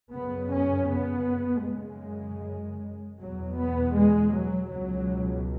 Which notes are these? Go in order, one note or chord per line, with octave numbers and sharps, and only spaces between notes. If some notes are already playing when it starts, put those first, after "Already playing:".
F#2 C#3 B3
C#4
B3
F#2 C#3 G#3
E2 B2 F#3
B3
G#3
F#3
C#2 B2 F#3